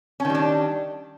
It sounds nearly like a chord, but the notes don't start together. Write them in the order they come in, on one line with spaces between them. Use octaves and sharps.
C#4 D#3 G3 D4